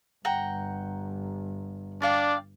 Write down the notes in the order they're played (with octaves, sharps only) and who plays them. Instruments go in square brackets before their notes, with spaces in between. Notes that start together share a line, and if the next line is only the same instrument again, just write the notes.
[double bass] G1 [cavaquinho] F#5 G5 A#5
[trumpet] D4 [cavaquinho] D5 F5 G5